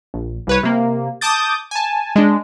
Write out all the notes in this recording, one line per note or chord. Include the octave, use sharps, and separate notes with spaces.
A#1
C2 B4 C#5
C3 A#3
A5 D6 D#6 G6 A6
G#5 A5
G#3 D4